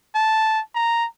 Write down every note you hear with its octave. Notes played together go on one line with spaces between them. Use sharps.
A5
A#5